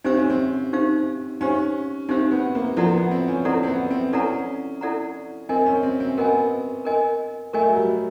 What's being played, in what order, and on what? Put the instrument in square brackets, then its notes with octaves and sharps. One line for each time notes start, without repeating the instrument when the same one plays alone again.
[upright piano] C4 [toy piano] D#4 G4 C5 F5
[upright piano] C#4
C4
[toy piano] D#4 G4 C5 F5
[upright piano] C#4 [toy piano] D#4 G4 C5 F5
[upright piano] C4 [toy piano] D#4 G4 C5 F5
[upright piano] B3
A#3
[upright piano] F3 [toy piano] E4 A4 D5 F#5 A#5
[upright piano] B3
C4
C#4
[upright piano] C4 [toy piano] E4 A4 D5 F#5 A#5
[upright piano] C4
B3
C4
[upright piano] C#4 [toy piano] E4 A4 D5 F#5 A#5
[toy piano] E4 A4 D5 F#5 A#5
[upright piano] C4 [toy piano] A#4 D#5 G#5
[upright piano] C#4
C4
C4
[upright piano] B3 [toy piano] A#4 D#5 G#5
[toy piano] A#4 D#5 G#5
[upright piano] A3 [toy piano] A#4 D#5 G#5
[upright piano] F#3
G3